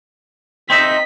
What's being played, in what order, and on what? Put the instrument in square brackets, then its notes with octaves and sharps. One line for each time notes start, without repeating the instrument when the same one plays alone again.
[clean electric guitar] C4 D#4 E5 [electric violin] D#5 B6